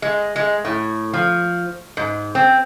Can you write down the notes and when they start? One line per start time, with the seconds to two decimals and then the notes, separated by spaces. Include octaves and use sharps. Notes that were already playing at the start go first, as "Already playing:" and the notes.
0.02 G#3
0.36 G#3
0.65 A2
1.14 F3
1.97 G#2
2.35 C4